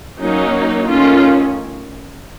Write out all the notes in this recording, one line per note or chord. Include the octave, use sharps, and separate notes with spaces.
F#3 A#3 C#4 D#4
D#3 A3 C#4 F4